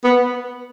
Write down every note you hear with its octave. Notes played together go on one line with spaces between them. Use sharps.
B3